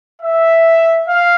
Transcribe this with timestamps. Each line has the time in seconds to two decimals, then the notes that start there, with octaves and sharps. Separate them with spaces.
0.22 E5
1.07 F5